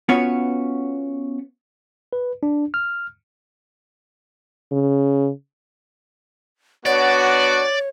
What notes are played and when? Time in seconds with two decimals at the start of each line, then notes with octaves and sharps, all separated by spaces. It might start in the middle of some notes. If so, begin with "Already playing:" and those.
0.09 B3 C#4 F4 F#4 B4 C#5
2.13 B4
2.43 D4
2.74 F6
4.72 C#3
6.86 B3 D4 F#4 C#5 D5